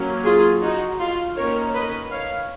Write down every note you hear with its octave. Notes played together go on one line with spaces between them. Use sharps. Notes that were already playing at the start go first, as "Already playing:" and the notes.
Already playing: F#3 A#3 C#4
F4 G#4
D#4 F#4
F4
D#3 A#3 C#4 A#4 C#5
B4 D#5
C#5 F5